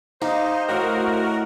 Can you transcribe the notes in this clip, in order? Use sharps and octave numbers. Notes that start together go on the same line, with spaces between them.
D#4 G4 C5 F5
A2 F#4 A#4 D#5 G5